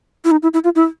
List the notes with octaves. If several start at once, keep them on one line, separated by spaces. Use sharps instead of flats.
E4
D#4
E4
E4
F4
E4